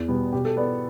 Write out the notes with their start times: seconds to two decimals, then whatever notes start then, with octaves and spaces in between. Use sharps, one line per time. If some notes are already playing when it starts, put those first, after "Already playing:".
Already playing: E2
0.08 B2 G3 B3
0.33 B2 G4
0.45 A4
0.57 B3 D5